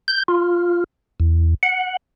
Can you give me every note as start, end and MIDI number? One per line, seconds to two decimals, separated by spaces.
0.08 0.23 91
0.28 0.84 65
1.20 1.54 40
1.63 1.97 78